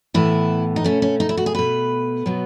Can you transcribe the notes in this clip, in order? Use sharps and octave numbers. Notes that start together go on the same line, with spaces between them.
A2 E3 B3 E4
D#4
B2 A3 C#4
C#4
D#4
E4
F#4
G#4
B2 A3 B4
B2 F#3 B3